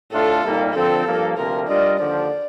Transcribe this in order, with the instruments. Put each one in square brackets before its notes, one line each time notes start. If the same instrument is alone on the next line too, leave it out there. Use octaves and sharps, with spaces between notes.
[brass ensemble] A2 A3 D4 F4 [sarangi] A4
[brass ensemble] C2 A#2 G3 A#3 D#4
[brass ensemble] D3 F3 C4 [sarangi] A4
[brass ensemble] G2 F3 A#3
[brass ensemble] D2 C3 F3 A#3 F4 [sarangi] A#4
[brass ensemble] G3 D4 F4 A#4 D#5 [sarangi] D5
[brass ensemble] D#2 D3 F3 [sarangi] D5